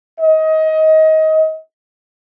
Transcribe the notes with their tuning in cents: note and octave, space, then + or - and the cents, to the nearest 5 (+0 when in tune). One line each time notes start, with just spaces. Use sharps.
D#5 +25